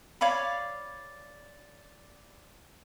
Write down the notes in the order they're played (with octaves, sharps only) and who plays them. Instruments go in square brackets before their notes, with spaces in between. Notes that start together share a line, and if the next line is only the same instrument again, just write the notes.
[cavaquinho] C#5 D5 F5 B5